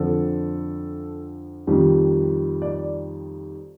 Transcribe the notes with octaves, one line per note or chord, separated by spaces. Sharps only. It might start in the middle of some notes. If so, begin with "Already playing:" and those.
Already playing: F2 D3 F3 A4
F2 D#3 G3
D5